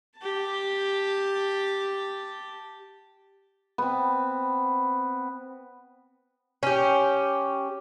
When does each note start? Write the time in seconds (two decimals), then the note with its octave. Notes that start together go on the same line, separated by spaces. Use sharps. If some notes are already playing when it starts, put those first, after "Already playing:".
0.18 G4 A5
3.78 B3 C4
6.63 C#4 G4